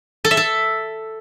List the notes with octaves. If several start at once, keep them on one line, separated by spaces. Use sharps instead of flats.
A4
E5
A4